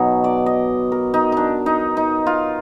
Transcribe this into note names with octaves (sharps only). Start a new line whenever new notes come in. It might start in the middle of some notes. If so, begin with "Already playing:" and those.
Already playing: B2 F#3 D#4
D5
D#5
A#4
D#4
D4 D#4
D#4
D#4
F4